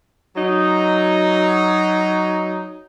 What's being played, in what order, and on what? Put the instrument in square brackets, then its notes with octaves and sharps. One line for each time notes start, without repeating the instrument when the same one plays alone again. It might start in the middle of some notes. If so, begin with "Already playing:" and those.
[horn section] F#3 D#4